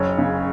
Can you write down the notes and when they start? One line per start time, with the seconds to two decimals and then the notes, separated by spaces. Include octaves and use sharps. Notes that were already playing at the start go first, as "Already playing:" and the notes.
Already playing: F#1 C#5
0.18 C#3